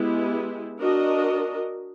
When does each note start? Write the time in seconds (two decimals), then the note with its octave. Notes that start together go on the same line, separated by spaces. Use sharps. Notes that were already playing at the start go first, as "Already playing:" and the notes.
Already playing: G#3 B3 E4 G4
0.79 D4 F#4 A#4 D#5